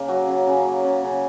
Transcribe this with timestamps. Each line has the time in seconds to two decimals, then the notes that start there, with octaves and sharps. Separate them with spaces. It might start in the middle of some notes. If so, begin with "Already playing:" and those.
Already playing: C#3 A#3
0.08 F#3
0.27 C#3
0.47 C#3
0.66 A#3
0.85 C#3
1.03 C#3